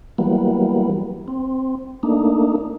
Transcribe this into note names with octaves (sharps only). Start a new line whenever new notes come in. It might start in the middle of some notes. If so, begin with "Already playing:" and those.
E3 F#3 G3 A#3 B3
C4
A3 A#3 D4 D#4